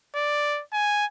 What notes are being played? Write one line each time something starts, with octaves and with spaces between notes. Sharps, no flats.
D5
G#5